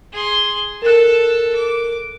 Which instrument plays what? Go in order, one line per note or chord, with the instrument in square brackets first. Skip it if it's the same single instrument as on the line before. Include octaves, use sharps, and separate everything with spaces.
[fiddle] G#4 C6
[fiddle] A4 A5 [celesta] A#4 F#6
[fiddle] D6